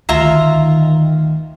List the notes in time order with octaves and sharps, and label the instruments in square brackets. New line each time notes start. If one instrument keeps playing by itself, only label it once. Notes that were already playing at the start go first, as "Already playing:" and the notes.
[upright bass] D2 [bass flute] D#3 [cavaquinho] F4 E5 A#5